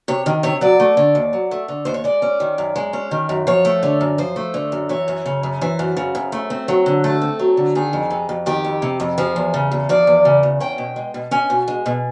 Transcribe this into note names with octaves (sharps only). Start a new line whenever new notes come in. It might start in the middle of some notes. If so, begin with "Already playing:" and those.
C3 C#5
D#3
C3 C#5
F#3 D5
A3
D3
D#2
F#3
A3
D3
D#2 C5
C#5
G#3 D5
C#4
D#3
F#2
G#3
C#4
D#3
F#2
F3 C#5
A3
D3
F#2
F3 C5
A3
D3
F#2
E3 C#5
F#2
C#3
F#2
E3 C5
F#2
C#3
F#2
A3
C4
F#3
D3
A3 A4
C4
F#3
D3
D#3 G#4
F2
C3
F2
D#3 G4
F2
C3
F2
F3 G#4
E2
C#3
E2
F3 D5
E2
C#3
E2
C#4 G5
B2
G#3
B2
C#4 G#5
B2
G#3
B2